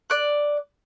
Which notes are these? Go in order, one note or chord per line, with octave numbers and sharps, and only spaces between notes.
D5 F#6